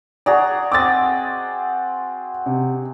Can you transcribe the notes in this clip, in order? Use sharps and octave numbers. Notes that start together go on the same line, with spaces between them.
F#4 G#4 D5 A#5
C4 D#5 F#5 D6 A6
C3